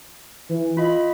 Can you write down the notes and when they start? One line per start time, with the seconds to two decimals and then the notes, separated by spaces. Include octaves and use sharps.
0.49 E3
0.77 F4 D#5 B5